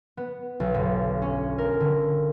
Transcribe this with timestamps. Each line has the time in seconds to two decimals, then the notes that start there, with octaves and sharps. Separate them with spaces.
0.17 B3
0.60 B1
0.74 G1
1.22 C#4
1.58 A#4
1.80 D3